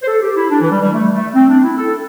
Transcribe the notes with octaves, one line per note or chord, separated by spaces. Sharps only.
C5
A4
G4
E4
D4
E3
G3
G3
A3
A3
C4
D4
E4
A4